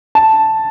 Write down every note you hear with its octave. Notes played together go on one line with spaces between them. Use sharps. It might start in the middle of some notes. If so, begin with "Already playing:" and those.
A5